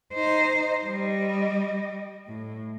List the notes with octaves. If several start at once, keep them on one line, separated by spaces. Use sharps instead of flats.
D#4 C5
G3 D#5
A2